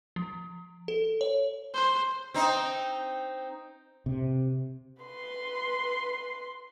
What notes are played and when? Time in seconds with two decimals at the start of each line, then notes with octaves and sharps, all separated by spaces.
0.16 F3
0.88 A4
1.21 C#5
1.74 C5
2.34 C4 D#4
4.06 C3
5.03 B4 C6